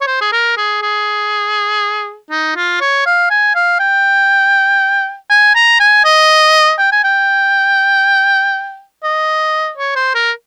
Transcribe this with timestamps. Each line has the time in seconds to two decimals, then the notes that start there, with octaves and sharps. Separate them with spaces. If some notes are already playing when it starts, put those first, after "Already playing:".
0.01 C#5
0.07 C5
0.21 G#4
0.32 A#4
0.57 G#4
0.82 G#4
2.31 D#4
2.56 F4
2.81 C#5
3.06 F5
3.31 G#5
3.55 F5
3.80 G5
5.30 G#5
5.55 A#5
5.80 G#5
6.05 D#5
6.79 G5
6.92 G#5
7.04 G5
9.03 D#5
9.77 C#5
9.96 C5
10.15 A#4